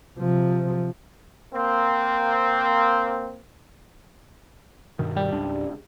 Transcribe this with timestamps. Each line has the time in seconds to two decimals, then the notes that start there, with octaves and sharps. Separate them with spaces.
0.19 C3 F3
1.54 A#3 C4
4.99 G2 B2 D#3
5.16 G3
5.32 C#2 G#2 D4